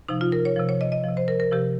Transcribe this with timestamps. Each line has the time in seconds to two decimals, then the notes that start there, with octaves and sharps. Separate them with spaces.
0.08 C3 F3 D#4
0.21 F4
0.32 A#4
0.45 C#5
0.56 C3 F3
0.69 C#5
0.81 D#5
0.92 D#5
1.04 C3 F3
1.17 C5
1.28 A#4
1.40 A#4
1.52 C3 F3 G4